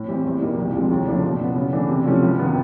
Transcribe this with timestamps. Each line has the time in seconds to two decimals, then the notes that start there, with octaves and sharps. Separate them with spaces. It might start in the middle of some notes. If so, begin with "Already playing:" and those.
Already playing: A2
0.08 E3 G3 C4 E4
0.25 E2
0.41 B2 G3 A#3 D#4
0.58 C2
0.75 C3 F3 G#3
0.91 D#2
1.07 C#3 F3 A3 D4
1.23 B2
1.39 F#3 B3
1.56 C#3
1.73 E3 A3 D4
1.89 C3
2.05 F3 A3 C#4
2.23 C#2
2.39 C3 D#3 G3 B3